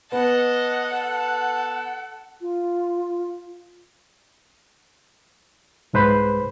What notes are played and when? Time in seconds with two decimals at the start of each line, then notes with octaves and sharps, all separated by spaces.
0.12 B3 D#5 F#5 A5
0.93 A4
2.41 F4
5.93 C2 G#2 B4 C5 B5